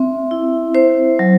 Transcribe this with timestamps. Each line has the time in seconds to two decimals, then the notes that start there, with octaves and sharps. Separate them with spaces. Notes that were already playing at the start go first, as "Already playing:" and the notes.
Already playing: C4 E5
0.31 E4
0.75 C5
1.19 F#3